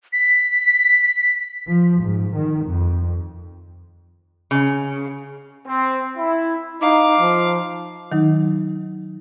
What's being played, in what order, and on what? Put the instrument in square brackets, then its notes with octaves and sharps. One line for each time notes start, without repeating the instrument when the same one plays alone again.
[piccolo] B6
[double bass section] F3
G#2
D#3
F2
[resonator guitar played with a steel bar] C#3
[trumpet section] C4
E4
[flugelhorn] D#4 [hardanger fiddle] F5 [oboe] D6
[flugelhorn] F3
[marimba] D#3 F#3 D#4